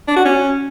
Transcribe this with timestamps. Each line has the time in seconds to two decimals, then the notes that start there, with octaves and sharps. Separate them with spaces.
0.08 D4
0.16 F#4
0.25 C#4